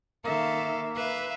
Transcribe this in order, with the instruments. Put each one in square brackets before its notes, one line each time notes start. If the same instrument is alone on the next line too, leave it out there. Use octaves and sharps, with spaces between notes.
[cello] D#3 E5 [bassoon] A#3 [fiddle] A4 F5
[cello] B4 [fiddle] E5 F5